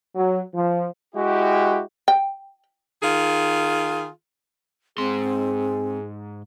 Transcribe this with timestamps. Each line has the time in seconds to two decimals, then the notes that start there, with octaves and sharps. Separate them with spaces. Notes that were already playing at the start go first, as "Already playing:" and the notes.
0.16 F#3
0.54 F3
1.15 G#3 E4 F#4 G4
2.08 G5
3.03 D#3 F4 G#4
4.98 G#2 C4 G#4 C6